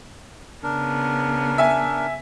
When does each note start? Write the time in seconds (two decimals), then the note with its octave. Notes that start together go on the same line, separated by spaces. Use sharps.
0.63 C#3 B3 D4 A#4
1.58 E5 G#5